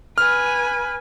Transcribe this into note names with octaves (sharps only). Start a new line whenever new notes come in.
B4 G#5 F6